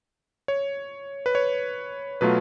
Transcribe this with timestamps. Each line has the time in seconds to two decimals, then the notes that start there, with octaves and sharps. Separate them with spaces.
0.48 C#5
1.26 B4
1.35 C#5
2.21 B2 F#3 A3 F4 B4